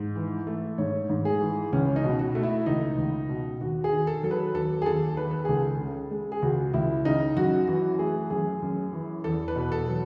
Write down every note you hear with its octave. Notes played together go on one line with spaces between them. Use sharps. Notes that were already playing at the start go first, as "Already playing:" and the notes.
Already playing: G#2
E3
A3
G#2 C#5
G#2
G#4
E3
C#2 C#4
D#4
B2
F#4
A3
E4
C#2 D#4
C#2
B2
D#2 F#4
G#4
D#3
A4
F#3 A4
B4
D#2 A4
G#4
D#2 A4
D#3 B4
A4
C#2 G#4
A4
C#3
G#3
G#4
C#2 F#4
C#2 E4
C#3 D#4
F#2 F#4
E3 F#4
A3 G#4
F#2 G#4
F#2
E3
E2 A4
B4
B2
A4
F#3